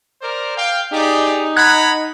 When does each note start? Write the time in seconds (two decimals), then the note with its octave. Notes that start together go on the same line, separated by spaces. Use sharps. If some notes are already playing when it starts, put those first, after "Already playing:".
0.22 A#4 C5 D5
0.57 F5 G5
0.93 D#4 G4 G#4 D5
1.56 F#5 A#5 B5 F#6 G#6